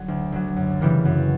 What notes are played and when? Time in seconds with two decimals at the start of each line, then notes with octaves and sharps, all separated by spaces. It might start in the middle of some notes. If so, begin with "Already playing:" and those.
Already playing: D3 F#3
0.08 D2
0.32 D3 F#3
0.56 F#2
0.81 C#3 E3 G3 A#3
1.05 F#2